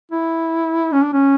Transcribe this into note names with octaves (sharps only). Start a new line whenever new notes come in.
E4
C#4
D4
C#4